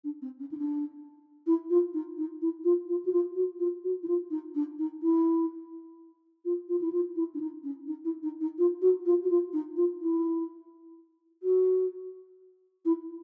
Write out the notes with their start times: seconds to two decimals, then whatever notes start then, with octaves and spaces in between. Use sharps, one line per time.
0.04 D4
0.21 C4
0.39 C#4
0.51 D#4
0.57 D4
1.46 E4
1.70 F4
1.93 D#4
2.18 D#4
2.41 E4
2.64 F4
2.88 F4
3.05 F#4
3.12 F4
3.35 F#4
3.59 F4
3.83 F#4
4.03 E4
4.07 F4
4.30 D#4
4.54 D4
4.78 D#4
5.02 E4
6.44 F4
6.68 F4
6.81 E4
6.92 F4
7.15 E4
7.34 D4
7.40 D#4
7.63 C#4
7.87 D#4
8.04 E4
8.22 D#4
8.40 D#4
8.58 F4
8.81 F#4
9.05 F4
9.23 F#4
9.30 F4
9.53 D#4
9.76 F4
10.01 E4
11.42 F#4
12.85 E4